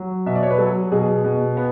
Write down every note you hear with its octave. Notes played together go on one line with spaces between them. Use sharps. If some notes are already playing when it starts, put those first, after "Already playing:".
Already playing: F#3
B2 E5
D5
C#5
B4
F#3 A4
B2 G#4
B2
B3